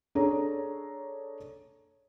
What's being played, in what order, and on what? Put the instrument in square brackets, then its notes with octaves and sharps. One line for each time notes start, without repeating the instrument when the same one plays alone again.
[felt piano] D4 G#4 A4 C#5 A#5